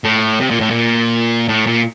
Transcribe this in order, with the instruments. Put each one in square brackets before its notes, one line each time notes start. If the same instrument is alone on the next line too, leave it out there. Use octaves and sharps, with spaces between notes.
[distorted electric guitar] A2
C3
A#2
A2
A#2
A2
A#2